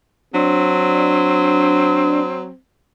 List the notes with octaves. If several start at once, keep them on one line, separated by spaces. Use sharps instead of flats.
F#3 C4 D4